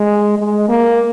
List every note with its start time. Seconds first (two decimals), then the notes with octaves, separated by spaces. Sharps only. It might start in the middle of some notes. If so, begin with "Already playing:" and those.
Already playing: G#3
0.38 G#3
0.69 A#3